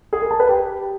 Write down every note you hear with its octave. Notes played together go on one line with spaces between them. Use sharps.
G#4
A#4
A5
B4
G4